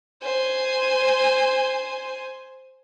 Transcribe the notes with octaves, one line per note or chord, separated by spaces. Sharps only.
C5 G#5